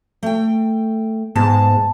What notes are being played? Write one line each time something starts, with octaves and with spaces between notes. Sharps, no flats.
A3 G5
G#2 G#3 B3 A5